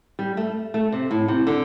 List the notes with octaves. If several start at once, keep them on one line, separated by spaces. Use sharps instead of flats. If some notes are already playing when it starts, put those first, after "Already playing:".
G3
A3
A3
C3
A2
C3
D3